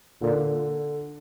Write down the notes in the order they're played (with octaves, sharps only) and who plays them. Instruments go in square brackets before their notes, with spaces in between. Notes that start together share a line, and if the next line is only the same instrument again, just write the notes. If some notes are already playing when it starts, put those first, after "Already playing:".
[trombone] A#2 [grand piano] D3